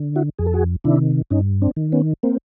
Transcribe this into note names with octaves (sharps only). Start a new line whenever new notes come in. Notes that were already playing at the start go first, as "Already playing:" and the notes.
Already playing: D3
E4 F#4
F2 G#4
A4
F#4 G#4
C3 D#3 D4 E4
G2 C#4 D#4
C4 D4
D#3
B3 C#4
A#3 C4